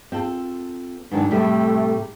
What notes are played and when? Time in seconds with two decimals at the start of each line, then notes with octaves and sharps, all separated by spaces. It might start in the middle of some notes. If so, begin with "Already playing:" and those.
0.12 C4 F4 A4
1.11 G#2 D#3 F#3 D4
1.31 A2 C3 G3 A3